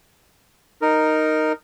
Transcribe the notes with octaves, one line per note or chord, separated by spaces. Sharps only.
D#4 A#4